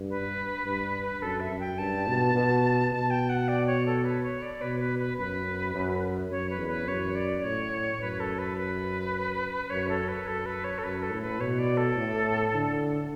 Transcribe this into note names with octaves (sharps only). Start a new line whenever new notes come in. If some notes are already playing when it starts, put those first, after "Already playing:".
Already playing: G2
B4
G2
F#2 A4
E5
F#2
G5
G2 A5
B2
B2
B2 A5
G5
F#5
D5
C#5
A4
B4
C#5
D5
B2 B4
B4
B4
F#2 B4
F#2
F#2 C#5
B4
E2
B4
F#2 C#5
D5
A2 C#5
F#2 B4
A4
B4
B4
F#2 C#5
A4
B4
F#2 A4
B4
C#5
A4
F#2 B4
A4
A2
B4
B2 C#5
D5
A4
A2
D3